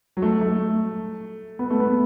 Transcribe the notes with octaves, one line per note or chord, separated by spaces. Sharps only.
F#3
A3
A3
B3
A3
B3